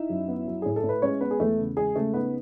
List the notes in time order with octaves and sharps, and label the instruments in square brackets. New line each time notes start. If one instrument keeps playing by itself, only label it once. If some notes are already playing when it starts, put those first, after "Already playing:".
Already playing: [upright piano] D#4 E4 E5
F#2
B3
F#3
A2 G#4
A4
A2
B4
G#3 C#4 C#5
B3 B4
G#4
E2 A3 A4
C#3
G#3 G#4
C#3 A3 A4
B3 D#4 B4